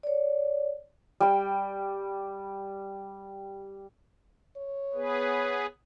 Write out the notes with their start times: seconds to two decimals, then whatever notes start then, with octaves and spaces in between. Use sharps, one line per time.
0.03 C#5 D5
1.20 G3 G5
4.57 C#5
4.94 B3 G#4 B4